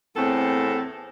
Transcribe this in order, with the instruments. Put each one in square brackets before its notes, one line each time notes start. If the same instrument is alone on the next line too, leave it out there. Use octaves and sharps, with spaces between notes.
[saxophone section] E2 A2 A4 [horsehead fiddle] C4